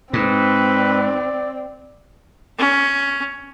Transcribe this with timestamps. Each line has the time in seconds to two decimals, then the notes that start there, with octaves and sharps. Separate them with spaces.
0.13 G#2 C4 B4
0.78 D5
2.59 C#4